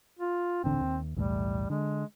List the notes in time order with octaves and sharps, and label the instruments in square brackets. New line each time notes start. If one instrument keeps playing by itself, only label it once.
[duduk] F4
[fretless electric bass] D#1 A1 D3 [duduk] C4
[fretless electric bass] D#2
[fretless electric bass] B1 E2 A2 [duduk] G3
[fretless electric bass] D3 [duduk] G#3